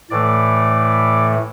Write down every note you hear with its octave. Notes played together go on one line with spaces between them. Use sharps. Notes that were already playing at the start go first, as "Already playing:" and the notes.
A2 E3 A3 D5